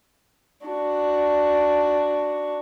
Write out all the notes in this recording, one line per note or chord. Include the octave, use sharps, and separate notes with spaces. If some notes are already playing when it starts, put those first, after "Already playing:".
D4 F#4